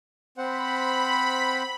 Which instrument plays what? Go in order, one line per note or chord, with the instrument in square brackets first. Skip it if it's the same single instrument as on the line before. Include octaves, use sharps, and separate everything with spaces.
[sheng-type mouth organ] C4 C5 F#5 [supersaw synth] B5